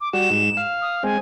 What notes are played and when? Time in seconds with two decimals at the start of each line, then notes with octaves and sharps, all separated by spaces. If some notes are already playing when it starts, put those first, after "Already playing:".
0.01 D6
0.13 G3 F#4 E7
0.30 G#2
0.57 F5
0.82 D#6
1.03 G#3 C4 G#5